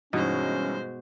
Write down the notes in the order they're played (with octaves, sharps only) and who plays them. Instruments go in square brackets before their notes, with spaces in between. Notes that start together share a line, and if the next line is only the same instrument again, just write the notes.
[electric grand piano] G2 E3 D#4 [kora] B2 [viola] G#3 C5 [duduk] C#4